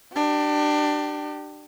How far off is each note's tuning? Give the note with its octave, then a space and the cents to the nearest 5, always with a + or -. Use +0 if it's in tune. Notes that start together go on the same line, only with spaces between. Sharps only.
D4 +20 G4 -20